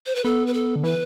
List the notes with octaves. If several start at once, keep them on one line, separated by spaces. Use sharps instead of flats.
C5
B4
B3 A4
B4
A4
D3
E3 B4